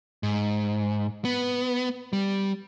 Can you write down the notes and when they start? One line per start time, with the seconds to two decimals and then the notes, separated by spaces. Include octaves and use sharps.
0.23 G#2
1.25 B3
2.13 G3